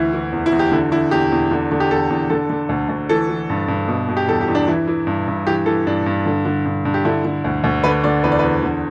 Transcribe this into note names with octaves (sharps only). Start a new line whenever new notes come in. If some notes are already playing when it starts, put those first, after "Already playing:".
Already playing: D2 E3 E4
E3
E2
E4
E2
G4
D3 E4
D3 E4
E2 G4
E2
D3
D3
G4
E2 A4
E2
D3 A4
D3
D2
D2
E3 A4
E3
G2
G2
B2
B2
G4
E2 A4
G4
E2
D4
E3 E4
E3
G2
G2
E3 G4
E3 A4
G2 D4
G2
D3
D3
G2
G2
G4
D3 E4
D3
D2
D2
D3 B4
D3 D5
E2 B4
D5
E2 B4
D3